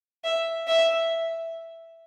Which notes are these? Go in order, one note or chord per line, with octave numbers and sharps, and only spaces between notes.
E5
E5